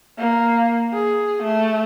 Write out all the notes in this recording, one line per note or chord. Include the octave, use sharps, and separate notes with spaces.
A#3
G#4
A3